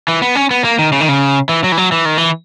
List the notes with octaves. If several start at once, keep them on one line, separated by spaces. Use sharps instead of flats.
E3
B3
C#4
B3
A#3
D#3
C#3
D#3
C#3
E3
F#3
E3
F#3
E3
D#3
E3